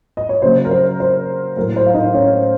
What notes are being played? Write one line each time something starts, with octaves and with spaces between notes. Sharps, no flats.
D#5
C#5
C#3 F#3 A#3 C5
A#4
C5
C5
A2 F#3 A3 A#4
C5
F5
D#4 D#5
C#4 C#5